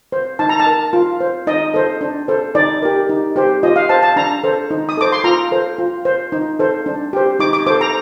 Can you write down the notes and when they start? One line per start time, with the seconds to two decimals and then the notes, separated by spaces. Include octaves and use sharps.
0.12 C5
0.39 D#4 A5
0.49 A#5
0.60 A5
0.66 A#4
0.93 F4
1.20 C5
1.47 D#4 D#5
1.74 A4 C5
2.01 D4
2.28 A4 C5
2.55 D#4 D5
2.82 G4 A#4
3.09 D#4
3.36 G4 C5
3.63 F4 D#5
3.76 F5
3.89 C5 A5
4.03 A5
4.16 D4 A#5
4.44 A4 C5
4.71 D#4
4.89 D#6
4.97 A4 C5 D6
5.12 C6
5.24 F4 A#5
5.52 A4 C5
5.78 F4
6.05 C5
6.32 D#4
6.59 A4 C5
6.86 D4
7.13 G4 C5
7.39 D#4 D6
7.53 D6
7.67 A4 C5 D6
7.81 A#5